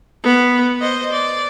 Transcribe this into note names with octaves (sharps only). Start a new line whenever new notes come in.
B3
C5 D#5
D5